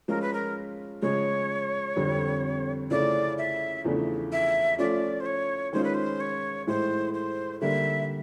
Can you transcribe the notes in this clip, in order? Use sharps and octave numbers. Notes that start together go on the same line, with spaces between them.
F3 G#3 C#4 F4 A#4
B4
A#4
C#3 F3 G#3 C#5
F2 D3 G3 C4
C#3 F3 A3 C#4 E4 D5
E5
E2 C#3 F3 A3 D4
E5
F3 A3 C#4 F4 D5
C5
C#5
D#3 G#3 C#4 F4 C5
B4
C5
C#5
A2 E3 G#3 C5
C5
D3 G3 A#3 E5